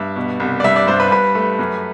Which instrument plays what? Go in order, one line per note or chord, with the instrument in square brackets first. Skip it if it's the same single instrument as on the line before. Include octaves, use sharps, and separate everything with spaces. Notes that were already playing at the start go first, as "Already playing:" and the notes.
Already playing: [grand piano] G2 E5
B2
C2
D5
G2 E5
D5
G2 C5
B4
G2 B4
A3
F#2